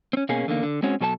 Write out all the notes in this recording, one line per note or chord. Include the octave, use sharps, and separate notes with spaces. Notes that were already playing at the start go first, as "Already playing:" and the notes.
C4 C#4
B2 A#3 C#4 G#4
E2 D3 D#3 A#3
D3
G#3 C4 C#4 F#4
B2 F#3 A4 B4 A5